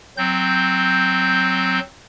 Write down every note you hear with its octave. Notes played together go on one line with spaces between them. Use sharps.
F#3 C4 G6